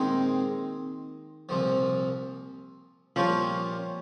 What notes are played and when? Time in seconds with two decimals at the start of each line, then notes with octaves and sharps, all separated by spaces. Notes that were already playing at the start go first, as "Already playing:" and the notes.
Already playing: A#2 D#3 G#3 C4 D#4
1.49 C2 A#2 F3
3.16 A#2 F3 G3 C#4 F4